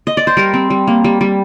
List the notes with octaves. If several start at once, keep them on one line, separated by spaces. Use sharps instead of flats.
D#5
D5
C5
G3 A#4
C4
G3
A#3
G3
G3